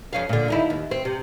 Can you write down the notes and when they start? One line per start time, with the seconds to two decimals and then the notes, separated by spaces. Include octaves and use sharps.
0.13 F2 C#4 F5
0.29 A#2 D3
0.48 D#2 D#4 E4
0.70 D#2
0.91 C4
1.05 C3